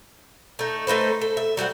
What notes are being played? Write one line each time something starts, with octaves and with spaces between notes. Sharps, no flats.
A3 D#4
A3 D#4 B4 C5
A4
E5
F#3 G3 C4 F#5